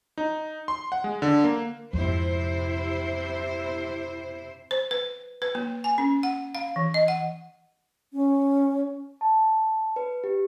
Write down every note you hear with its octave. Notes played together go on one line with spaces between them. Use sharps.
D#4
C6
F#5
G#3
D3
A#3
F2 G#2 C3 E4 C5
C5
B4
B4
A#3
G#5
C#4
F#5
F5
E3
D#5
F#5
C#4
A5
B4
G4